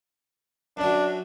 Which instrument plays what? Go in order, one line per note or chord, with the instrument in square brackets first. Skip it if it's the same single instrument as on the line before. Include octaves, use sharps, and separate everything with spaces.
[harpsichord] F#2 F#3 [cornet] D4